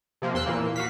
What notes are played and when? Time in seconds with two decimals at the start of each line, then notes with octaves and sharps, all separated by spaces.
0.22 C3 F3 A#3
0.34 E2 C6 E6 F#6
0.46 A#2 E3 A#3
0.76 F#4 F5 B6